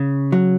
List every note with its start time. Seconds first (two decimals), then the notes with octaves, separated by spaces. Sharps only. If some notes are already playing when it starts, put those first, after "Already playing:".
Already playing: C#3
0.32 F#3